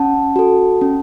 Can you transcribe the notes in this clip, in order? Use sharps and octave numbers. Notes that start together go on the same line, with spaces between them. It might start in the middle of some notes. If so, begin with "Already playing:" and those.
Already playing: C#4 F#5 A5
F#4 A4
C#4